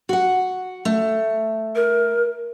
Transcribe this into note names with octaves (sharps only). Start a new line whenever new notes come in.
F#4 F#5
A3
A#4